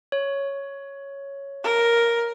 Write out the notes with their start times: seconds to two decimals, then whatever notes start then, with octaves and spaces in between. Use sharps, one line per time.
0.12 C#5
1.64 A#4